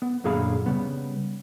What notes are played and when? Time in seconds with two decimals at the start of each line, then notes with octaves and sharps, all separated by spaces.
0.02 B3
0.24 F#2 A#2 D3 G#4 F5 B5
0.66 C#3 G3 B3